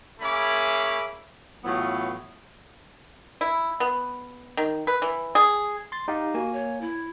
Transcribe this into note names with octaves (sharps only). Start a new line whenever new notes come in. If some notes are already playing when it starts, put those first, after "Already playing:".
A#3 C#4 G#4 E5 B5 D6
A2 E3 F#3 B3 F4
E4
B3
D#3
B4
E3
G#4
C6 A6
D#4 G4 F5
A#3 F#4 G#5
C#5
E4